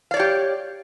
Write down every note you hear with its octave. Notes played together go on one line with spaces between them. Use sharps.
G4 C#5 D5 F5